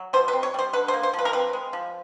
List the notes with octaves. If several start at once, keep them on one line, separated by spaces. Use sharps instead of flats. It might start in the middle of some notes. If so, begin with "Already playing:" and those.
Already playing: F#3
B2 C5
B4
C4
C#5
G3 C5
D3 B4
C5
A#3
C5
F3
B4
A#4
C4 B4
G#3
F3